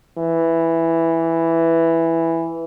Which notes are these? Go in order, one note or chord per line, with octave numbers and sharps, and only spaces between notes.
E3